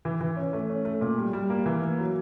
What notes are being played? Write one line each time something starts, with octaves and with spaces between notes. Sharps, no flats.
E3
E3
C#4
A3
C#4
A3
A#2
G3
G3
A#3
E3
A#3
F#3